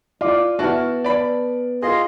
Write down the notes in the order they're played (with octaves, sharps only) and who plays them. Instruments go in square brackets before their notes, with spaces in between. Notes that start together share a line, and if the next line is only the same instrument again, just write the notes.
[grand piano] F4 [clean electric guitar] D5
[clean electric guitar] B3 [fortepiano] E4 F#4 [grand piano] A5 F6
[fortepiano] D5 B5
[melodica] F4 D#5 C6 [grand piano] G#4